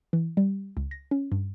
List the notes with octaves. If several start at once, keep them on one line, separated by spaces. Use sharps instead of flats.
E3
G3
C#2
A#6
C#4
G2